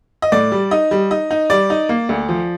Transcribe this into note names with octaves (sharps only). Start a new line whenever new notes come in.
D#5
A2 D5
G3
D#4 D#5
G3
D#4 D#5
D#4
G3 D5
D#4
A#3
D2
F3